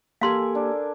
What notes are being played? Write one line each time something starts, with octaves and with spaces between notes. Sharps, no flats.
A#3 G4 A4 A#4 F5 G#5 C6
D4